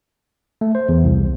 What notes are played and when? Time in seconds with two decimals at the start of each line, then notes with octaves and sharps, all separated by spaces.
0.61 A3
0.75 C5
0.89 E2
1.04 C2